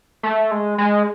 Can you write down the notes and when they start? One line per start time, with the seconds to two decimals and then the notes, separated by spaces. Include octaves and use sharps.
0.23 A3
0.51 G#3
0.78 G#3